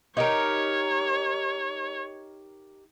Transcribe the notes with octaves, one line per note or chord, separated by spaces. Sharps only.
D#4 G4 A#4 C#5